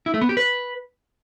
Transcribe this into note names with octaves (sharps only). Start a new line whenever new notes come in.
E4
A3
B3
G4
B4